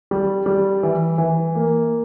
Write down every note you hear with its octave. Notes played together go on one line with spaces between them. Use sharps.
G3
G3
E3
E3
A#3